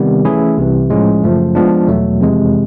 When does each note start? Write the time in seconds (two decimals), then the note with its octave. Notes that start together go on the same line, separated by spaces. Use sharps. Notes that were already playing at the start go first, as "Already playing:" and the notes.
Already playing: C3 D#3 G3 B3
0.25 E3 A3 C#4 E4 G#4
0.58 C2 C3 E3
0.90 A2 F3 G#3 C#4
1.23 F#2 C#3 F3 A3
1.55 F3 G#3 B3 D4
1.88 E2 B2 F#3 A3
2.20 F2 C3 E3 G#3